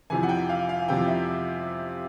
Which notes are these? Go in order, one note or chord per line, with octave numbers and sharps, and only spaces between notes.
F2 C3 E3 G#5
F#5
G5
F5
F5
F2 C3 E3 G5
E5